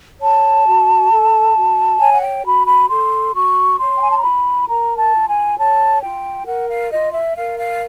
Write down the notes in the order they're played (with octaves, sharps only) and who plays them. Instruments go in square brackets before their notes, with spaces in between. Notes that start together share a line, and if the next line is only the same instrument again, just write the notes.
[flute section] C#5 A5
F#4
A4
F#4
C#5 G#5
F#5
G5
F#4 B5
B5
A4 C6
F#4 C#6
C#5 C6
G5
G#5
A5
A#5
F4 B5
A#4 A#5
A5
F4
G#5
C#5 A5
F4 G5
A#4 F#5
F5
F4 D#5
E5
A#4 F5
F5